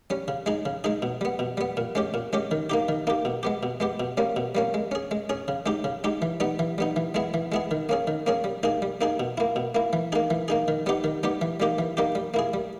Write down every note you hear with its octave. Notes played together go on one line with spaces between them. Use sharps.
G3 C#4
C#3
G#3 D#4 G#4
C#3
G#3 D#4 G#4
B2
G3 B3
B2
G3 B3
A#2
G#3 C#4 G4
A#2
G#3 C#4 G4
D#3
A#3 D#4 G4
D#3
A#3 D#4 G4
B2
G#3 B3 G4
B2
G#3 B3 G4
B2
G3 A#3 C#4
B2
G3 A#3 C#4
G#3
C#4 G#4
G#3
C#4 G#4
C#3
G#3 D#4 G4
C#3
G#3 D#4 G4
E3
G3 B3 D#4
E3
G3 B3 D#4
E3
G#3 B3 E4 G#4
E3
G#3 B3 E4 G#4
D#3
A#3 C#4 G#4
D#3
A#3 C#4 G#4
G3
A#3 D#4 G#4
G3
A#3 D#4 G#4
B2
A#3 E4
B2
A#3 E4
E3
A#3 D#4 G#4
E3
A#3 D#4 G#4
D#3
G3 B3 D#4 G4
D#3
G3 B3 D#4 G4
E3
G3 A#3 D#4 G4
E3
G3 A#3 D#4 G4
G3
A#3 E4 G#4
G3